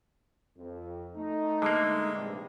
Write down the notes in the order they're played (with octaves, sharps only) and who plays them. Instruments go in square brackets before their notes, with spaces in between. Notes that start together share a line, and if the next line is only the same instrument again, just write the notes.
[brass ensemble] F2
A3 D#4
[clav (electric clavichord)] D3 A#3 [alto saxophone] G#3
[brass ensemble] A#1 G2 C3